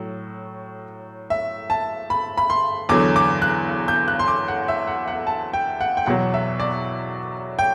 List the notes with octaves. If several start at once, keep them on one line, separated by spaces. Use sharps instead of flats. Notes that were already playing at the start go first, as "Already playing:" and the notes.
Already playing: A2 F#3
E5
A5
B5
B5
C6
E2 D3 F#3 D6
D6
F#6
G6
F#6
C6
D6
F#5
E5
F#5
F#5
A5
G5
F#5
G5
E2 B2 F#3 F#5
E5
D5
G5